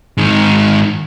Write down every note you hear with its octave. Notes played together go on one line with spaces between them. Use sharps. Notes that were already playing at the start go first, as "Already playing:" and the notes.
G#2 D#3